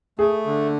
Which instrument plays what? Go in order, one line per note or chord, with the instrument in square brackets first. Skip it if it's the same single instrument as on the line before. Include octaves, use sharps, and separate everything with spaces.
[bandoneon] A3 [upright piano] G#4
[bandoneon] D3